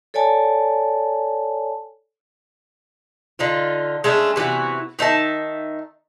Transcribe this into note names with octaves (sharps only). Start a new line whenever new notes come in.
A4 C#5 D5 G#5 A5
D3 D#4 F4
G#3 A3 C#4 D4
C3 E3 B3 F#4
D#3 D#4 E5 A5